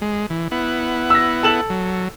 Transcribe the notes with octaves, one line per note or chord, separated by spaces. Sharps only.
G#3
E3
B3 E4 F#5
E6 A#6
A4 E7 F#7
F#3